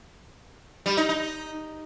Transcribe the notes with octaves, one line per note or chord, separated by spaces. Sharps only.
G3
D#4
D#4